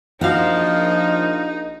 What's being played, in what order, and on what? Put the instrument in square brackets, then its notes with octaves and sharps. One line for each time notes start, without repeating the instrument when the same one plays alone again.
[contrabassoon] A#1 [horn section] F3 [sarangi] D#4 [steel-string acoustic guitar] F#4 A#4 F5